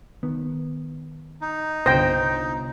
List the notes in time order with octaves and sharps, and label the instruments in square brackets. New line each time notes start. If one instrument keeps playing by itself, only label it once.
[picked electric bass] D#3 B3
[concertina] D#4
[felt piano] G1 A#6 [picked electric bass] C2 [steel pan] C5 G5